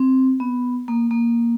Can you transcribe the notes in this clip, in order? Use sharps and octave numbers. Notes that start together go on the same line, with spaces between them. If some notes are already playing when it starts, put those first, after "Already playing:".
Already playing: C4
B3
A#3
A#3